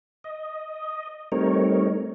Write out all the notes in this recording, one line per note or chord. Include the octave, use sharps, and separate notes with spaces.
D#5
G3 A3 C4 D#4 A#4 C#5